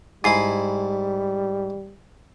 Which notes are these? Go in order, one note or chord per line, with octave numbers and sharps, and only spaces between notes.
G#2 G3 E4 G#5 C7